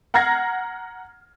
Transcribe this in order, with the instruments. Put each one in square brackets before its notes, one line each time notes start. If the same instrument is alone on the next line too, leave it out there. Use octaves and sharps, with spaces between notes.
[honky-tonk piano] F#5 A#5 F6 G#6 A#6 C7